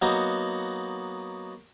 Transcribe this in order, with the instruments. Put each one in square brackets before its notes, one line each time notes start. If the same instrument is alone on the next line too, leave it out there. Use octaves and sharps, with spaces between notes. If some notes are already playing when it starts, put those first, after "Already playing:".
[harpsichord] F#3 A#3 B3 D#4 F#4